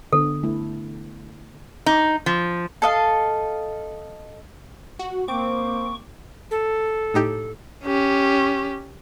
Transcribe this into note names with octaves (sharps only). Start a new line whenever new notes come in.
D3 B3 A4
A3 E4
D#4
F3
A4 D#5 F5
F#4
A#3 C4 C#6 D6
A4
A2 D#4 G4
C#4 G4